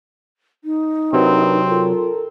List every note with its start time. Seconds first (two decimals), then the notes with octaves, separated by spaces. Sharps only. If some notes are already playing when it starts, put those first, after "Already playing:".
0.64 D#4
1.13 C3 F#3 C4 D4 A#4 B4
1.69 F4 A4 A#4